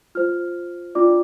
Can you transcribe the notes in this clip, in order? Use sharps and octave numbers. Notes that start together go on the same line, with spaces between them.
F4 C5 F6
D4 F4 D5 D6